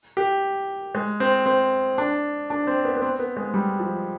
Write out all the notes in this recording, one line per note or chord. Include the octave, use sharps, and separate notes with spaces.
G4
G#3
C4
C4
D4
D4
C4
B3
B3
C4
B3
G#3
G3
F3